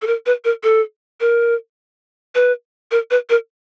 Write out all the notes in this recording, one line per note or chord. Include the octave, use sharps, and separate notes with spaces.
A4
A#4
B4
A#4
A4
A#4
B4
A#4
B4
A#4